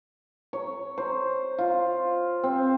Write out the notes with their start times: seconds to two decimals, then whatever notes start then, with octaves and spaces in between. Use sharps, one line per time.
0.53 C#5
0.98 C5
1.59 F4
2.43 C4